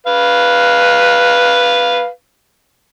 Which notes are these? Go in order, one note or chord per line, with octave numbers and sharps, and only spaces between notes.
B4 F5